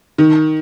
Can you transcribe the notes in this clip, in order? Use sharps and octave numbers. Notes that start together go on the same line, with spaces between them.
D#3